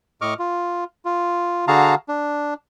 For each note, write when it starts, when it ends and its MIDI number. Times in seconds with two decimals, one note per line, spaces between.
0.21 0.34 45
0.21 0.34 75
0.21 0.34 85
0.21 0.34 86
0.21 0.34 89
0.39 0.84 65
1.05 1.65 65
1.68 1.95 50
1.68 1.95 66
1.68 1.95 68
1.68 1.95 77
1.68 1.95 81
1.68 1.95 82
2.08 2.54 62